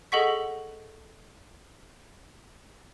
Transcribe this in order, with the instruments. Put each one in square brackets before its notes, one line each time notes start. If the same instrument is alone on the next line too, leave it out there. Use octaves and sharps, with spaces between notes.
[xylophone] G#4 A4 D#5 F#5 C#6 B6